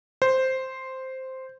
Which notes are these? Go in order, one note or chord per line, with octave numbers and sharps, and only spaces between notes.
C5